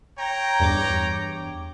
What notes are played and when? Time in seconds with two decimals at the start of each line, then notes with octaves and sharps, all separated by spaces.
0.18 C#5 G5 A#5
0.60 E2 G2 D6